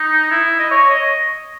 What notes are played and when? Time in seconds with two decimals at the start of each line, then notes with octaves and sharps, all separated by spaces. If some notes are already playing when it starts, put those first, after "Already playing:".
Already playing: D#4
0.31 E4
0.59 D#5
0.70 C#5
0.90 D#5